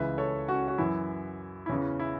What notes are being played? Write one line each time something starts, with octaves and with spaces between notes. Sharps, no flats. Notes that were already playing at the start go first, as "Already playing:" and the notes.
Already playing: C#2 C#3 E3 B4 E5
A4 C#5
C#4 F#4
F#4
F#2 E3 E4
E4
E2 C#3 E3 C#4
E4